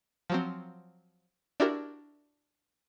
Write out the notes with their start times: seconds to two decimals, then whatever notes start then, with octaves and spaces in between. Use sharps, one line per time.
0.30 F3 F#3 C4
1.60 D4 E4 F#4 G4 A#4